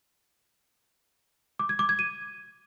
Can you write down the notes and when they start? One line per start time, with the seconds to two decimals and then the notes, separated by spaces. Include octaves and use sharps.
1.59 D6
1.69 G#6
1.79 D6
1.89 G#6
1.99 D#7